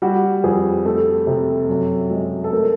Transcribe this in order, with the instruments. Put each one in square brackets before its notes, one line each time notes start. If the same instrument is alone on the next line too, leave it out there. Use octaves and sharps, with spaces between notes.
[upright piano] G3 F#4
F2 G#4
A3 A4
C3
F#2
G#3
A4
A3 A#4